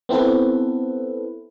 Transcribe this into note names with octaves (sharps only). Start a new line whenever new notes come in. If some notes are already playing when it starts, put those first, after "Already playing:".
B3 C4 E4 A4 B4